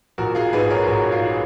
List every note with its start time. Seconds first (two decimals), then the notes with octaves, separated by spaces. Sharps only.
0.18 A#1 F#4 A#4
0.35 F4 G#4
0.53 G#2 G#4 B4
0.70 A#4 C#5
0.88 A#1 F#4 A#4
1.12 F4 G#4